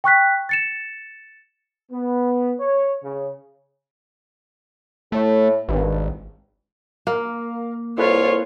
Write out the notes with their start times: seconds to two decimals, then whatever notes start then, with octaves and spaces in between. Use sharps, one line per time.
0.04 G5 C#6 F#6 B6
0.49 A6 C#7 E7
1.91 B3
2.60 C#5
3.04 C#3
5.12 A2 A3
5.69 G#1 G2
7.07 A#3 A#4 F5
7.98 C2 E4 F4 A4 B4 C#5